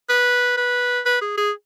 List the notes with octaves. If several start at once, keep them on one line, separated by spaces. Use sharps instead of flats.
B4
B4
B4
G#4
G#4